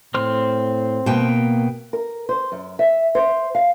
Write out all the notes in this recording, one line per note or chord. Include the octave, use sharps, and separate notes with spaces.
A2 C4 C5 F6
B2 A#3 G5
A#4
C5
F#2
E5
C5
F5